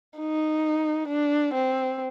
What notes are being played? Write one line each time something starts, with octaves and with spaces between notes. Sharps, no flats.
D#4
D4
C4